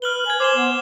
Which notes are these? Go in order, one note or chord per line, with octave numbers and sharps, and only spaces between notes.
B4 F6 F#7 G7
G#5 G#6 F#7
C5 D6 E7 G7
B3